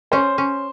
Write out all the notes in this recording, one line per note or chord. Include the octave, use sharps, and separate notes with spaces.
C#4 C5
C#4